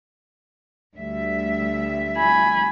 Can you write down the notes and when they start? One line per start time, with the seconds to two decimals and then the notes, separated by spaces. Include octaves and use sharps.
0.95 D2 G3 E5
2.17 G#5 B5